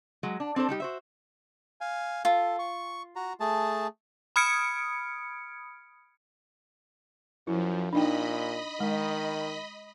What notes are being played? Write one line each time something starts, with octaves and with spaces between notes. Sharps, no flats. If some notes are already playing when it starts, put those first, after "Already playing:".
F#3 G#3
D4
C4 D4 A4 C5
G3 D#4 G4
F#4 C5 E5
F5 G#5
F4 A4
C#6
F#4 A#5
A3 G#4 A5
B5 D#6 F6 G#6 C#7 D7
F#2 F3 E4
A#2 D4 D#4 D#5 G5 B5
D#3 G#3